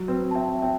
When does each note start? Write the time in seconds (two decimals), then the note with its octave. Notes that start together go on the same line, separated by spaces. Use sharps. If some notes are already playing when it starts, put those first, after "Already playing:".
Already playing: F#3
0.08 C4 B4
0.31 A5
0.35 C4 E5 G5
0.62 C4 E5 G5